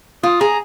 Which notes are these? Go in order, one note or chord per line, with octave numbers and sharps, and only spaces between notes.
F4 D#6
G#4 A#5